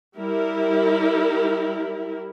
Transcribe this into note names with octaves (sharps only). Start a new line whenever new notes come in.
G3 E4 A#4